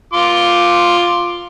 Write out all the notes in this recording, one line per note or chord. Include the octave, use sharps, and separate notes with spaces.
F4 C6 D6